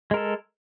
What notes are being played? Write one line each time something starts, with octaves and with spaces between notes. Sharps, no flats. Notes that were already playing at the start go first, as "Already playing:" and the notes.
G#3 A4 A#4